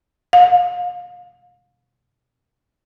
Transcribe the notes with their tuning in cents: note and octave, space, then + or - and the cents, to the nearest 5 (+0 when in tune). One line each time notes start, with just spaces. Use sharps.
F5 +30